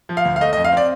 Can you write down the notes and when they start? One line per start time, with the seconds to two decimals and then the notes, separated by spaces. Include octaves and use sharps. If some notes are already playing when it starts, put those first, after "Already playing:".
0.09 F3
0.17 F5
0.25 D2
0.36 F5
0.41 A3 D#5
0.53 D#5
0.57 F2
0.64 F5
0.72 C4 D5